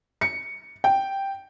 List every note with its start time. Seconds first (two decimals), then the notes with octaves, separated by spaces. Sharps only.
0.21 C#7
0.84 G5